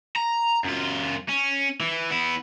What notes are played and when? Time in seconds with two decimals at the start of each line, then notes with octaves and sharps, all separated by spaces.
0.16 A#5
0.64 F#2 F4
1.29 C#4
1.81 E3
2.11 B3 E4